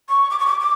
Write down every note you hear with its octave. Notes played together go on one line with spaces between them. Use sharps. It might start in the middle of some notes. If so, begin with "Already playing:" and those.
C#6
D6
C#6
D6
D6